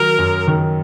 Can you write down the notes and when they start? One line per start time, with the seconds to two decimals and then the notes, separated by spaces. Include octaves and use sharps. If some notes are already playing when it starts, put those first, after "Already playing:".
Already playing: D#3 F#3 A#4
0.19 F#2
0.47 D#3